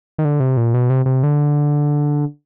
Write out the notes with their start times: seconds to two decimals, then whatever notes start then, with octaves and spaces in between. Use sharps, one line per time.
0.18 D#3
0.25 D3
0.40 C3
0.57 A#2
0.74 B2
0.90 C3
1.06 C3
1.23 D3